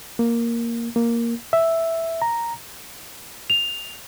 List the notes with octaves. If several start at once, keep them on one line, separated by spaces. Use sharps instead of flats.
A#3
A#3
E5
A#5
F7